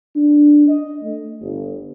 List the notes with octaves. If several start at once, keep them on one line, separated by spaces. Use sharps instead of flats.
D4
D#5
A3
G1